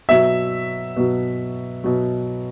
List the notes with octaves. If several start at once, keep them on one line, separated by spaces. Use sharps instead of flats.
B2 F#3 E5
B2 F#3
B2 F#3